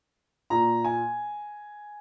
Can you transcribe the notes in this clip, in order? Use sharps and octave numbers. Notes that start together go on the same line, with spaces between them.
A#2 A#5
G#5